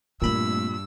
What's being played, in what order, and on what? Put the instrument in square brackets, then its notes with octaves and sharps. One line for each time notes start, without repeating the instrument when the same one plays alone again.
[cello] G2 [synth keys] A#2 B5 [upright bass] A3 C4 [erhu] E6